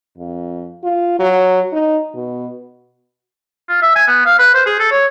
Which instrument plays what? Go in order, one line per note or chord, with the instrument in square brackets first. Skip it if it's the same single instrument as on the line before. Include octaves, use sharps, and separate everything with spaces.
[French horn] F2
F4
F#3
D#4
B2
[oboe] F4
E5
G#5
B3
F5
B4
C5
G#4
A4
C#5